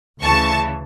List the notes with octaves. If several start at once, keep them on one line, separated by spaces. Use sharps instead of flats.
D2 C#3 E3 A5 C#6